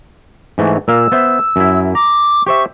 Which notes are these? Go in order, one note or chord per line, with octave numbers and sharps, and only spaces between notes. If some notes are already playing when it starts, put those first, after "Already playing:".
G#2 E3 A3
A#2 A#3 F5 E6
B3 C5 E5
F#2 E4
A#5 D6
G4 C5 E5 C#6